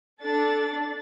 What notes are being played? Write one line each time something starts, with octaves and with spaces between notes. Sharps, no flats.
D4 A4 A6